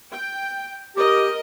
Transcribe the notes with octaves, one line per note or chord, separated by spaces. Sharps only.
G5
G4 A#4 D#5